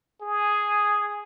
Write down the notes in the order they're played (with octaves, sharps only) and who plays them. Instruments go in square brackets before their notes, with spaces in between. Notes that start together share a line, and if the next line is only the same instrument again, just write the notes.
[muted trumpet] G#4